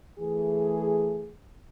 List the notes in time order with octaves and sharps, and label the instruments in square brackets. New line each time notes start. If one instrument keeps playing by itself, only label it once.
[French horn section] E3 A3 G#4